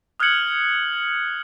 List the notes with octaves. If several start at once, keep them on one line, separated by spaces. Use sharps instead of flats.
D#6 F6 F#6 G#6 C#7 F#7